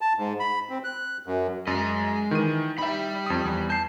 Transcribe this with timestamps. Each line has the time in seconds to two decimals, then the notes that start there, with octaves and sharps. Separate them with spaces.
0.01 A5
0.18 G#2
0.40 B5
0.70 C4
0.84 F#6
1.26 F#2
1.67 F#2 G#3 D#5
2.31 D#3 E3 D#7
2.78 G3 D#4 E5 B5
3.26 F2 D#6
3.45 E2
3.70 A5 G6 C7